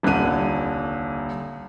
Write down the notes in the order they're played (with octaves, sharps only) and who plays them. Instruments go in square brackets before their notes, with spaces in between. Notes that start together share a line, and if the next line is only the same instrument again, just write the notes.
[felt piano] D#1 C2 D3 F#6 D#7